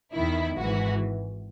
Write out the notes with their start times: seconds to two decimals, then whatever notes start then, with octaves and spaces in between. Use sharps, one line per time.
0.14 E2 D#3 E4
0.57 G#1 G#2 E3 F#4